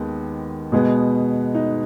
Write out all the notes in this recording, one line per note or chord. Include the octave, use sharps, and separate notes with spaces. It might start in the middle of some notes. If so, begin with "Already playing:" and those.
Already playing: D#2 D#3 G#3 B3
B2 G#3 B3
D#4